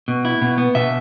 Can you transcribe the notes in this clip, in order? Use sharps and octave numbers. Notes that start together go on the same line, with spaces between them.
B2
E4
B2
B3
B2 E5